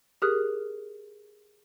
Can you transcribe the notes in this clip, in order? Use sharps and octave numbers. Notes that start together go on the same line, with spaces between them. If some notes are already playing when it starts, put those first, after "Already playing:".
G4 G#4 A#4 D#6 F6 F#6